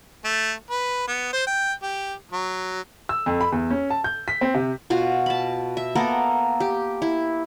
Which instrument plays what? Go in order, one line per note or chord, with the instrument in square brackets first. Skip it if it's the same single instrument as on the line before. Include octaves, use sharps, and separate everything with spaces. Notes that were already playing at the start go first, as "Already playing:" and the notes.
[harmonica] A3
B4
B3
C5
G5
G4
F#3
[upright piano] E6
F2
B5
E2
C#4
A5
G6
B6
C4
C3
[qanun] B2 F4 F#4
A5 B5
E5
A#3 B3 A4 A#4
G4
E4